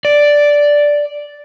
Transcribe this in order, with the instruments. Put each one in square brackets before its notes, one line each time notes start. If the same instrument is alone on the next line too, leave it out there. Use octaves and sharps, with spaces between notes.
[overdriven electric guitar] D5